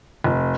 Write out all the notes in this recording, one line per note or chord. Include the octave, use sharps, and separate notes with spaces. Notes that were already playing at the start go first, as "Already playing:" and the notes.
F1